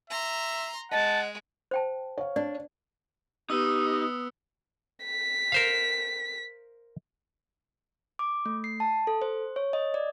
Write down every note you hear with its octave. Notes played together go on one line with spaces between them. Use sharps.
E5 A#5 C6
G#3 D#5 F#5 A5
C5 G5 A5
C#5 F5
D4 D5
B3 D#4 G4 D#6 E6
B6
A#4 C5 F5
D6
A3
C7
A5
A4
C5
C#5
D#5
D5